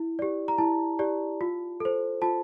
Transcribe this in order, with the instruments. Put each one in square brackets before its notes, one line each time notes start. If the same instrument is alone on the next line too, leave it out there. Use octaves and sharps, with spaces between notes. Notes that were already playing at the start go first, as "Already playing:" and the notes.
Already playing: [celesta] E4
G4 D5
A#5
E4 A5
G4 D5
F4
A4 C5
F4 A5